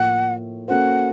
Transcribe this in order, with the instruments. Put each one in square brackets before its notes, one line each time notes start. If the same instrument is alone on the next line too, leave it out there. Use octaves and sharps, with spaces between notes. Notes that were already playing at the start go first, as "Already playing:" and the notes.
Already playing: [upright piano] A2 F3 A#3 [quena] F#5
[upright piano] A#3 C#4 F#4 A4 C5 [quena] F#5